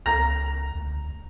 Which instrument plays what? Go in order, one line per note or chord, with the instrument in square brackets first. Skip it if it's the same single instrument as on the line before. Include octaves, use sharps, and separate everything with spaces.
[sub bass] C#2 [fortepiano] A#5
[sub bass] D2